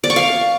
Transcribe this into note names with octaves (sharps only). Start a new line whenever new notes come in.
D5
C#6
F5